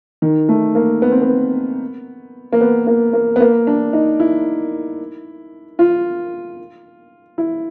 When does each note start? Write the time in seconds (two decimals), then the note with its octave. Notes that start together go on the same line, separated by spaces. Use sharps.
0.22 D#3
0.49 A3
0.75 A#3
1.02 B3
1.12 C4
1.22 B3
2.52 A#3
2.61 B3
2.87 A#3
3.13 A#3
3.36 B3
3.40 A#3
3.67 D4
3.93 D#4
4.20 E4
5.79 F4
7.38 E4